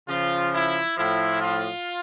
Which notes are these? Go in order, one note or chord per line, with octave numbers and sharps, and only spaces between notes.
C#3 F3 F4
E4
A2 F3 E4
F4